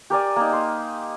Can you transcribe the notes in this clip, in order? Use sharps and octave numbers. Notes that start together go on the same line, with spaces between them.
G4 A#4 D5 G#5
A#3 D#4
C6